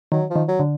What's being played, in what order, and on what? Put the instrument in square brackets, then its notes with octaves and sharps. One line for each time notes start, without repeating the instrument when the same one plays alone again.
[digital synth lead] D#3 [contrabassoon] F#3
[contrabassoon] F3
[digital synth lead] D#3
[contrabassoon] F#3
[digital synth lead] D3